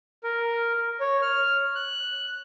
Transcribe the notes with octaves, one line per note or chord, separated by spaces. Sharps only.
A#4
C#5
F6
F#6